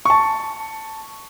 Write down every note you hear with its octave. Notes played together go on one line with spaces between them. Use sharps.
A5 C#6